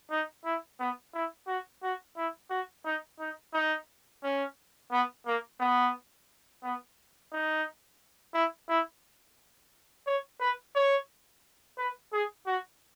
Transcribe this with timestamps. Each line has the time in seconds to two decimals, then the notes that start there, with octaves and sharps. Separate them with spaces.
0.11 D#4
0.45 E4
0.80 B3
1.14 E4
1.47 F#4
1.83 F#4
2.17 E4
2.50 F#4
2.85 D#4
3.19 D#4
3.53 D#4
4.23 C#4
4.92 B3
5.26 A#3
5.60 B3
6.63 B3
7.32 D#4
8.34 E4
8.69 E4
10.06 C#5
10.40 B4
10.75 C#5
11.78 B4
12.13 G#4
12.46 F#4